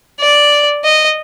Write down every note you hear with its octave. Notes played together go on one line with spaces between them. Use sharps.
D5
D#5